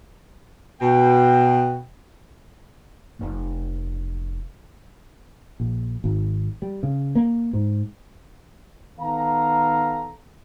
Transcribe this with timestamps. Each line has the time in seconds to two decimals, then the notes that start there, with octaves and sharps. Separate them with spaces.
0.81 B2 G5
3.19 F1 F2
5.60 A#1
6.04 G#1
6.62 G3
6.83 C#3
7.15 A#3
7.53 G#2
8.99 D#3 B3 A4 F5 A#5